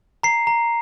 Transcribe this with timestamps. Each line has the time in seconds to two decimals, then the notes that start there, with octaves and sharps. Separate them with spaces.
0.23 A#5 C7
0.47 A#5